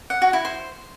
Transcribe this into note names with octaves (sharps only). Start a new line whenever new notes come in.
F#5
F#4
E4
C5